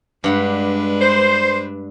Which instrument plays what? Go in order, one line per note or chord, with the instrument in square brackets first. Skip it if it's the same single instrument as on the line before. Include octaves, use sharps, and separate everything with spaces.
[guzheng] G2 F#5 B5 [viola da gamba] G#3 D4 B4
[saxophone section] C5